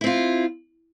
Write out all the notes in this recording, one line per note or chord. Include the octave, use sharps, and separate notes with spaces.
C4 E4 F4